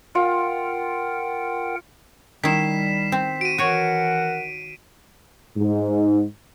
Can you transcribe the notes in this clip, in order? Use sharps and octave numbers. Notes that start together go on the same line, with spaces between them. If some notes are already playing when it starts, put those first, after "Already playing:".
F4 A#4 F#5 G5
D#3 G3 E4 B6 C7 E7
C4
F#4 D7 D#7
E3 F#4 A#4 C#5 F#5
G#2